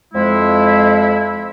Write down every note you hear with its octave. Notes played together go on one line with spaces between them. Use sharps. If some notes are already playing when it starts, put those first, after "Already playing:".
F2 G#3 E4